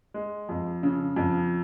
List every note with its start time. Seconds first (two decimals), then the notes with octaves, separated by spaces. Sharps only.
0.14 G#3
0.49 F2
0.83 C#3
1.16 F2